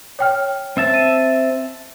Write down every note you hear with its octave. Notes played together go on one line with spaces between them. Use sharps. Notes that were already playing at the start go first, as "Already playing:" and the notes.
C#5 G5 F6
C4 E5 A5
D#7